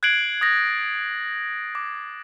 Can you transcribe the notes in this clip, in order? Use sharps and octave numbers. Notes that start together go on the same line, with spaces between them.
F#6 G#6 C7 D7 F#7
D#6 A6 A#6
D6